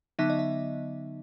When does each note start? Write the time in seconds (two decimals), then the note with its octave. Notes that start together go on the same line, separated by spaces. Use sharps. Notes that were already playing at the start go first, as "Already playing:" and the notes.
0.19 D3 F#3 B3 D#4 E5
0.30 D#5
0.39 E5